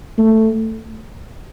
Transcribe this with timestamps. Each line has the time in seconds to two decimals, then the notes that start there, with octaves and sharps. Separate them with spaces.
0.18 A3